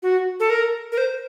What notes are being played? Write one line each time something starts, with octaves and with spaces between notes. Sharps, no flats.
F#4
A4
A#4
A#4
C5